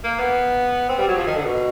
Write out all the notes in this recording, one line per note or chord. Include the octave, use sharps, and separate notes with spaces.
A#3
B3
C4
G3
F#3
F3
D#3
D3
B2